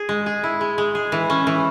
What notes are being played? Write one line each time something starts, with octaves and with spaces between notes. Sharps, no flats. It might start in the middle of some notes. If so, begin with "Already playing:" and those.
Already playing: G#4
G#3
G#4
E4
G#3
G#3
G#4
E3
C#4
E3